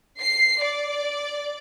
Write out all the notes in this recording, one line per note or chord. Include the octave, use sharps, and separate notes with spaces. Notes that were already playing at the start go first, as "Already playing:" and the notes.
C7
D5